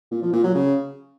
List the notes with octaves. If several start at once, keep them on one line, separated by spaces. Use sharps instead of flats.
A#2
F3
A#2
F#3
C#3